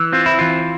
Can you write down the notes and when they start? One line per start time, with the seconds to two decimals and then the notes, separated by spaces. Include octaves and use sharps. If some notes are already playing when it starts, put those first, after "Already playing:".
Already playing: E3
0.12 C4 F4
0.26 E4
0.39 E3 F4